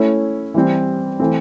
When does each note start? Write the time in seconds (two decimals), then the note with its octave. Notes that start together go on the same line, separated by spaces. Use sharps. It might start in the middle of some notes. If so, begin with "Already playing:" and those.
Already playing: A3 C#4 E4
0.54 E3 G3 C4
1.20 E3 A3 C4